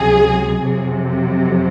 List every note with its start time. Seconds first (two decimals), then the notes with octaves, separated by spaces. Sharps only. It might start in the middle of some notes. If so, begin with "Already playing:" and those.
Already playing: C#2 C3 F#3 G#4
0.60 F2 C3 F#3